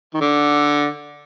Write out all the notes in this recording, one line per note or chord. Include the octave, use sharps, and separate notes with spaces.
D#3
D3